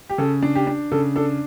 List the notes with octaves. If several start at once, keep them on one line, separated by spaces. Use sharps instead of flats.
G4
C#3 A4
D4
G4
D4
C#3 A4
D4 A4